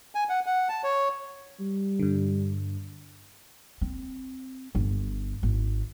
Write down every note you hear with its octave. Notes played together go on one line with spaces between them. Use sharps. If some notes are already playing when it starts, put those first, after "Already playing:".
G#5
F#5
F#5
A5
C#5
G3
G2 D3
C4
G1
G#1